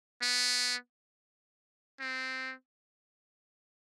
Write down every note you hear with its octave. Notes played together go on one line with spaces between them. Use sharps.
B3
C4